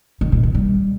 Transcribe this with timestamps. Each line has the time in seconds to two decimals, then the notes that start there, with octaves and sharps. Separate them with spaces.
0.21 D#3
0.32 A#2
0.43 D#3
0.54 G3